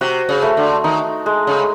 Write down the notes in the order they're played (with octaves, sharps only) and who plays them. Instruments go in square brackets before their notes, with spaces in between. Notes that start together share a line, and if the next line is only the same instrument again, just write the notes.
[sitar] C3 [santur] F#4
[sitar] C#3
[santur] A3
[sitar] D3
[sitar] D#3 [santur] D#4
[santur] G#3
[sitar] C#3